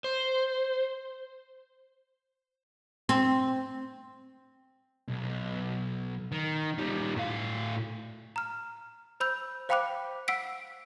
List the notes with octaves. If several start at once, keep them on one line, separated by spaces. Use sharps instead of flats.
C5
C4
B1
D#3
D#3 G3
A2 F5
A#5 F6
C5 B5 E6 G6
C5 F5 G5 B5 D6 F#6
F#5 E6 B6 D7